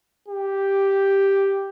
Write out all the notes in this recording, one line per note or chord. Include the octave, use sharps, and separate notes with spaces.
G4